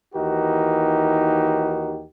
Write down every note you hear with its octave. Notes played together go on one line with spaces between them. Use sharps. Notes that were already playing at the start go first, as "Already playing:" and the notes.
D#2 E3 D#4 F#4 G4 A#4